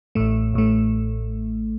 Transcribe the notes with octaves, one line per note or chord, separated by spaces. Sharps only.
A1 A2 A3
A1 A2 A3